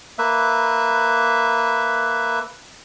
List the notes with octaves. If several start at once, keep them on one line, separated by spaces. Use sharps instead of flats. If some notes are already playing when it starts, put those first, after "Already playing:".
A#3 B4 E5